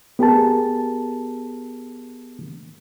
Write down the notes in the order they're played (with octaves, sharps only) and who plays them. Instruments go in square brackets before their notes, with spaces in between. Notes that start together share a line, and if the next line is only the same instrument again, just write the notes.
[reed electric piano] B3 G4 G#4 A#4 A5